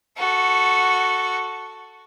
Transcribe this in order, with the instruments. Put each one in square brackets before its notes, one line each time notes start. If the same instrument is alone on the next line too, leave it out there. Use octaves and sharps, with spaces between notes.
[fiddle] F#4 A4